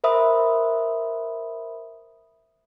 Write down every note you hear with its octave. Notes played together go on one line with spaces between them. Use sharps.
A#4 C5 E5 B5 D#6